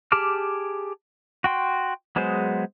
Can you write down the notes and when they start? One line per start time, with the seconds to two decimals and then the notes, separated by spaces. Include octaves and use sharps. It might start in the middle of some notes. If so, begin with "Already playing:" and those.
0.12 G4 G#4 A5 D6 F6
1.44 F#4 G5 C6
2.16 F#3 G#3 B3 G#4 C5